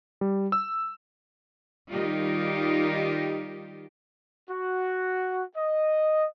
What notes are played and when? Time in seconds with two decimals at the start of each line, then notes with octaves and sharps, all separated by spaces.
0.21 G3
0.52 E6
1.91 D#3 G3 D#4 F4 G4
4.49 F#4
5.56 D#5